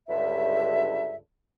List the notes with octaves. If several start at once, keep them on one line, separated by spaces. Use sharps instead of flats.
C#2 G2 D3 E5